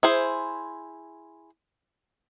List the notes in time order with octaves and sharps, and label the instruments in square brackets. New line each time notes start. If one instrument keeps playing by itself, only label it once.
[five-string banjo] E4 G#4 C5